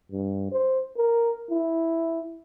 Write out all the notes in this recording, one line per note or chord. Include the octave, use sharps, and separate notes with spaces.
G2
C5
A#4
E4